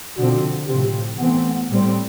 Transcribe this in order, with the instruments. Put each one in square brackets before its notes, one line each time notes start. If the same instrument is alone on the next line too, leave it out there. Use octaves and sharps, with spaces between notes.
[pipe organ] B2 [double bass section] D3 F3 C4
[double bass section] A2 F3 C4 [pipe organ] C3
[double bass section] E3 A3 C4 [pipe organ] B3
[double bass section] A2 G3 C4